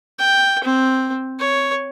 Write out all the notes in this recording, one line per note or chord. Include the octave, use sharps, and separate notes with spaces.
G5
C4
C#5